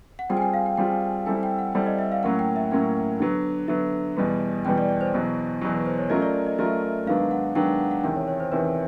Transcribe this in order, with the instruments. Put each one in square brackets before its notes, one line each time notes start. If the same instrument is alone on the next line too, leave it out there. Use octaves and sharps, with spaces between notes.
[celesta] F#5
[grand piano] G3 C4 F4 G#4 [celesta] G5
[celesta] G#5
G5
F5
G5
[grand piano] G3 C4 F4 G#4 [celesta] G5
[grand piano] G3 C4 E4 A4 [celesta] G#5
[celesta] G5
F#5
[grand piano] G3 C4 E4 A4 [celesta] D5
[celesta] D#5
E5
F5
[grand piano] A2 F#3 A#3 C#4 [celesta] F#5
[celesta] G5
E5
[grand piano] A2 F#3 A#3 C#4
D3 F#3 B3
[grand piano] D3 F#3 B3 [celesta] E5
[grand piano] E2 B2 G3 B3
[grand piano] E2 B2 G3 B3 [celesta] G5
[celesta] D5
D5
C5
[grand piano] E2 B2 F#3
E2 B2 F#3
[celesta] B4
C5
C#5
[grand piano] F#3 A3 C#4 F4 A#4 [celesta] D#5
[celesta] D5
D5
D#5
[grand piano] F#3 A3 C#4 F4 A#4 [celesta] E5
[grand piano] G#2 D#3 F#3 B3 D4 [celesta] F5
[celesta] F#5
[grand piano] G#2 D#3 F#3 B3 D4 [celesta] G5
[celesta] F#5
F#5
[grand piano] E2 C3 D#3 [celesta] G5
[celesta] C#5
C#5
C5
[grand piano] E2 C3 D#3 [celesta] B4